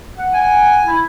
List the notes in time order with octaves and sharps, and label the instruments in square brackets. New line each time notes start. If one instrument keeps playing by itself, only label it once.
[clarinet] F#5
[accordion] G#5
[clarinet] E4